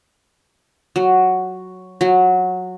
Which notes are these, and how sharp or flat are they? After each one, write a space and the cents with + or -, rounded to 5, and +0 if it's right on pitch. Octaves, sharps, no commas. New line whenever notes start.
F#3 +0
F#3 -15